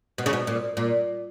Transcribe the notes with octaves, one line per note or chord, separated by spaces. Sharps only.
B2
C#3
B2
A#2
A#2